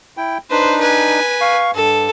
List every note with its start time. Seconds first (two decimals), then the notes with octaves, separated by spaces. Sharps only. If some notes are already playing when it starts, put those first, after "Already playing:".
0.17 E4 G5
0.51 D4 D#4 B4 C5
0.80 B4 G#5
1.41 F5 C#6
1.74 G2 A4